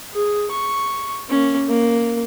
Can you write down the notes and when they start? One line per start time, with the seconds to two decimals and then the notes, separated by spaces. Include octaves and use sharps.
0.13 G#4
0.51 C#6
1.30 A#3 C#4
1.69 A#3